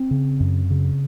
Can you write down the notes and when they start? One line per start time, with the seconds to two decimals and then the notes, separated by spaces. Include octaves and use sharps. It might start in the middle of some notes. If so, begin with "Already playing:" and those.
Already playing: C4
0.11 C#3
0.40 F#2
0.70 C#3